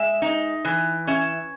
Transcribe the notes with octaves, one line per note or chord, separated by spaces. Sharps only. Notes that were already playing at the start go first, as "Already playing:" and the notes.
Already playing: G#3 E5
D#4
E3
C#4 E5